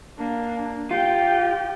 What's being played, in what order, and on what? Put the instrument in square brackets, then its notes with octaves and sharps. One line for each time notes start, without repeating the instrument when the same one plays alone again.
[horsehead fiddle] A#3 D4
[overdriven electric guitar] F4 [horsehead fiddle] G4 G5